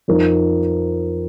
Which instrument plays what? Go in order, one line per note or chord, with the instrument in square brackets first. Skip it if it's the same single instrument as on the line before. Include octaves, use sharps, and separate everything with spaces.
[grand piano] F2 F3 D#4 A#4